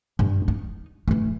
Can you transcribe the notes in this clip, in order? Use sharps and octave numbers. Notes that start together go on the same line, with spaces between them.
G2
D#4
E3 A3